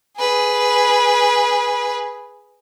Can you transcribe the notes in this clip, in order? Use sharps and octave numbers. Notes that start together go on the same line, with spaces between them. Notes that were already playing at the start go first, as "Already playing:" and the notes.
G#4 B4